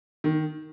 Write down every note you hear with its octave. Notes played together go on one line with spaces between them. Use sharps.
D#3